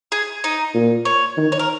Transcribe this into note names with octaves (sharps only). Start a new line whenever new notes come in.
G#4
D#4
A#2
C#5
D#3
C#5
A#4